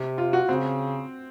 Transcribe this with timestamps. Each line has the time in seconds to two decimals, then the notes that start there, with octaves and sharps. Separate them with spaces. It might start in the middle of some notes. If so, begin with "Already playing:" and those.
Already playing: C3
0.18 F4
0.33 F#4
0.48 C#3 C4